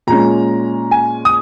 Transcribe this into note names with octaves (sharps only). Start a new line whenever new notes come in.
A#2 G#3 C#4 A#5
G#5
D#6